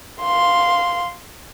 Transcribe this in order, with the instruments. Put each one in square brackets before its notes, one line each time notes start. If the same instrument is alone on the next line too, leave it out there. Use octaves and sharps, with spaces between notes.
[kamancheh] F5 C6